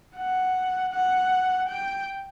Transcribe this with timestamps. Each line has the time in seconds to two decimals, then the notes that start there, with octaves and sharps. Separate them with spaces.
0.18 F#5
0.93 F#5
1.69 G5